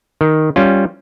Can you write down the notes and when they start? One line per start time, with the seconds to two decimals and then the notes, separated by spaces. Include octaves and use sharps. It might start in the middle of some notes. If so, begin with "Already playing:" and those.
0.21 D#3
0.56 G3 C#4 F4